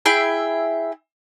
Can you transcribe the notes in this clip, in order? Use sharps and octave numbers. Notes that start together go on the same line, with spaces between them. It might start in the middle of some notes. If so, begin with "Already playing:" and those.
E4 G#4 E5 G5